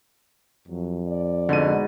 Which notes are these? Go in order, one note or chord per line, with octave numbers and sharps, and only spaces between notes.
F2 F#3
D5
G#2 B2 D3 D#7